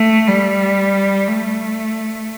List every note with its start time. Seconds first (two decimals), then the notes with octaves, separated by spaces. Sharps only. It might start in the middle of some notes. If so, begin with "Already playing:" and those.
Already playing: A3
0.28 G3
1.28 A3